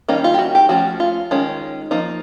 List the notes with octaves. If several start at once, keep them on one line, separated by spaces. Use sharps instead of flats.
D#3 G3 A#3 C#4 D#4
F4
G4
F#4
G4
F3 A3 C#4 F#4
F4
D#3 G#3 C#4
F3 A#3 D#4